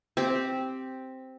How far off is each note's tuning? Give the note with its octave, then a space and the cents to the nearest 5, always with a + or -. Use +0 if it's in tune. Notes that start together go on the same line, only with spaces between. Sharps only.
C4 +0 G4 +0